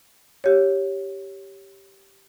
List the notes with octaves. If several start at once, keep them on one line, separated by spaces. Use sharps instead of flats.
G4 C#5